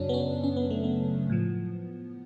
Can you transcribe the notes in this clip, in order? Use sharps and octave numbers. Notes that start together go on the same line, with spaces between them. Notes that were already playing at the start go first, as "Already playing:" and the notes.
Already playing: F#2 C#3 F#3 C#4 D4
B3
C#4
C#4
B3
A3
B3
A2 F3